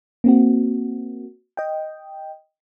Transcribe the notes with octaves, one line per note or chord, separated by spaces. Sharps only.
A#3 C4 F#4
D#5 G5